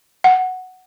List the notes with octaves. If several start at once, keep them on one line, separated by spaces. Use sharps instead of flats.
F#5